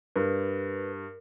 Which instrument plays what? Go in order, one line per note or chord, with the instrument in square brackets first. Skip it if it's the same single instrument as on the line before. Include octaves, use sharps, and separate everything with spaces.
[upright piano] G2 [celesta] A#4 [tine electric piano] B4